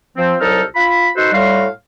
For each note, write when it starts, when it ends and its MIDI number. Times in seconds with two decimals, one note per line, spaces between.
0.16 0.34 53
0.16 0.34 60
0.41 0.61 36
0.41 0.61 54
0.41 0.61 63
0.41 0.61 69
0.41 0.61 89
0.75 1.09 65
0.75 1.09 83
1.16 1.30 63
1.16 1.30 66
1.16 1.30 69
1.16 1.30 71
1.16 1.30 72
1.32 1.66 45
1.32 1.66 55
1.32 1.66 66
1.32 1.66 77
1.32 1.66 84